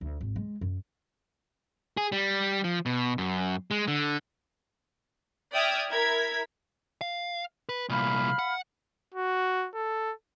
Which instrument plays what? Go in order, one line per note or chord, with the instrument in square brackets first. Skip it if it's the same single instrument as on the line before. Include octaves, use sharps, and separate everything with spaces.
[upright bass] D2
G#1
G#3
F#2
[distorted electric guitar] G#4
G3
F3
B2
F#2
G#3
D3
[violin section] D5 E5 G5 D#6 F6 G#6
E4 A#4 G#6 B6
[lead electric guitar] F5
B4
[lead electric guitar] C2 A#2 [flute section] F5 B5 F6
[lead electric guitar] F#5
[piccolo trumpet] F#4
A4